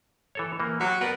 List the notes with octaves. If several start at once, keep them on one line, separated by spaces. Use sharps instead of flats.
E3 A4 C#5
E3 A#3
F#3 G4
B3 A#4 D5